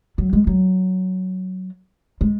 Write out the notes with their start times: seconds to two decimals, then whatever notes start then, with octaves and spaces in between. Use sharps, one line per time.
0.18 F#3
0.33 G#3
0.47 F#3
2.21 G#3